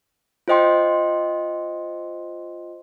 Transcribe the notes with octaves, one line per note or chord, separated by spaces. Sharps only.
F4 C5 D#5 G5 C6